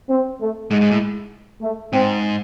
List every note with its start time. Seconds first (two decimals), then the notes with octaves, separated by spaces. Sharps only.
0.09 C4
0.41 A3
0.71 G#2 G#3
0.81 G#2
0.91 A2
1.61 A3
1.93 G#2 C4